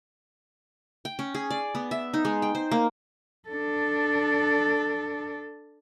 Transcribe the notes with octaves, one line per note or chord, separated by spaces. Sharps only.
G5
C#4
G#4
D5
B3
E5
D#4
G#3
G5
C5
A#3
D4 A4